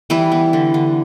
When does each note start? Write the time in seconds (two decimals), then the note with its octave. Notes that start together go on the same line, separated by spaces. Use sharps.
0.10 E3 G3 E4
0.32 B3
0.53 D3
0.74 D3